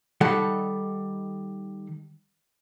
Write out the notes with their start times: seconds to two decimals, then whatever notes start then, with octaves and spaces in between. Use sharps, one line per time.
0.21 D#3 G3 A4 F#5